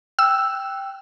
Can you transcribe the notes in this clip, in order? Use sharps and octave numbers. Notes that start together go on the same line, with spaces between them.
G5 E6 F#6